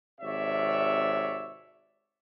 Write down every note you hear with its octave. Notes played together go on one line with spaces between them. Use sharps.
G#1 C3 C#5 D5 E5